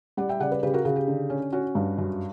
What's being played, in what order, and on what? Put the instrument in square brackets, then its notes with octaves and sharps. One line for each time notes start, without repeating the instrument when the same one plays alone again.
[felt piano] G3 D5 F#5
E5 G5
C#3 D5 F#5
B4 D5
C#3 G4 B4
F#4 A#4
C#3 F#4
G4
D3
C#4
C#4 F#4
G2
F#2